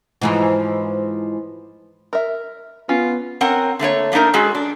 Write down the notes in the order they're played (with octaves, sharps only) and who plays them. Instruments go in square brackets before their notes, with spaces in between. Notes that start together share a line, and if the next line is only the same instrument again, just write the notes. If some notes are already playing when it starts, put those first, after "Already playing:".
[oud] G#2 E3 F3
[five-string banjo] A#4 E5
[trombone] B3 [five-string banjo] C#4 [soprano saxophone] F4
[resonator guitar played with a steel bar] C4 C#4 A#4 F#5
D3 A3 A#3 C#5
A3 A#3 D4 D#4 A#4
G#3 C#4 F#4 G#4 A4
D4